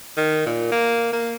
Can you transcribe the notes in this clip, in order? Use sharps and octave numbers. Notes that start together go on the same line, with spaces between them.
D#3
A#2
A#3
A#3